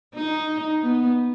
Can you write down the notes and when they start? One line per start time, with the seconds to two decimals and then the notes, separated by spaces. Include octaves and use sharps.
0.14 D#4
0.83 B3